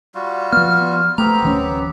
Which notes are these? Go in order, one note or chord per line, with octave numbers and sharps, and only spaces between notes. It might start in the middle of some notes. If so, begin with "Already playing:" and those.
G3 F4 F#4
F3 B3 F6
A3 B3 C4 G4 A#5
D1 E3 C#4